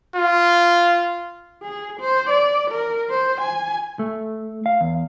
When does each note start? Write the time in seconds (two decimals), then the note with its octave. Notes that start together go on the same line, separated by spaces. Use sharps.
0.16 F4
1.63 G#4
2.00 C5
2.30 D5
2.71 A#4
3.10 C5
3.41 G#5
3.99 A3
4.66 F5
4.81 E2